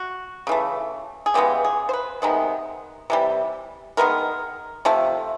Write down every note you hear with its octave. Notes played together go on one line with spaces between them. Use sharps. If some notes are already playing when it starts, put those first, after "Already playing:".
Already playing: F#4
C#3 E3 A3
G#4
C#3 E3 G#3 B3 G4
G#4
C5
B4
C3 D#3 G#3 B3
C3 E3 G3
D#3 G#3 B3 A#4
C3 F3 A3